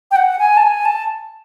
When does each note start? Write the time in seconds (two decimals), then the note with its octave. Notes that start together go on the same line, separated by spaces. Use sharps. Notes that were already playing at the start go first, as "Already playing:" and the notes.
0.11 G5
0.16 F#5
0.39 G#5
0.57 A5
0.62 G#5
0.85 A5